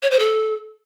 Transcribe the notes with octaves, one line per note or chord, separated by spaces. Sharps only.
C#5
C5
A4